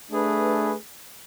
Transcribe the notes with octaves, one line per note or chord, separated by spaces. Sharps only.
A3 D4 G#4 B4